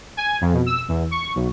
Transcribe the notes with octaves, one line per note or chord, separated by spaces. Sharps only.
G#5
F2
B2
E6
E2
C#6
B1